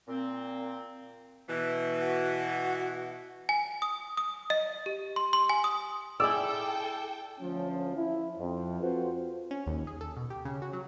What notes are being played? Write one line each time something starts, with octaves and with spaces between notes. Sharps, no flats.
A#2 C4
B2 E3
F#4
G#5
D#6
D#6
D#5
G4
C6
C6
G#5
D#6
E4 G#4 A4 D5 G5 D6 E6
D2 F3 C#4
E4
F2
C4 F4 F#4 A4 B4 C5
C#4
D#2
G#4
A4
B2
G4
C#3
F#4
F#3